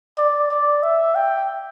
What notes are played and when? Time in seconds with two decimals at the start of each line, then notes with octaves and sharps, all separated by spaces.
0.18 D5
0.50 D5
0.83 E5
1.15 G5